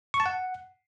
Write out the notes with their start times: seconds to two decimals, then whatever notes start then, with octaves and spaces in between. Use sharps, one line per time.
0.14 C#6
0.20 A5
0.26 F#5